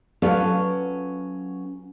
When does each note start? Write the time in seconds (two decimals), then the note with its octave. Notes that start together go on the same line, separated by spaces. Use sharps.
0.22 F#3 C#4 F4 A4 B4 D5